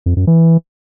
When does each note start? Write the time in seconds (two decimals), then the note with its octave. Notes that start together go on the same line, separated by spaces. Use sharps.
0.06 F2
0.17 F#2
0.27 E3